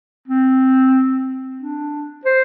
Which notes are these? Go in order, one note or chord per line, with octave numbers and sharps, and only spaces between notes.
C4
D4
C5